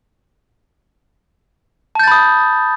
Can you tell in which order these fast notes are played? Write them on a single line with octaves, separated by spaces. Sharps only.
A5 G6 A6 B5 D#6